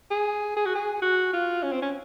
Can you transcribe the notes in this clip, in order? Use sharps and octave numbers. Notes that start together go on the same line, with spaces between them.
G#4
G#4
F#4
G#4
F#4
F4
C#4
C4
C#4